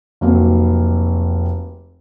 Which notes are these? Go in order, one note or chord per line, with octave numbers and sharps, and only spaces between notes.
F1 F#3 A#3 C4